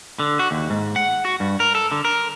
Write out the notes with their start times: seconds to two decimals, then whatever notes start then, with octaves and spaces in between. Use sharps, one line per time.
0.19 D3
0.39 F#4
0.51 D#2
0.70 G#2
0.96 F#5
1.25 F#4
1.40 G2
1.60 A#4
1.75 A4
1.91 D3
2.05 A#4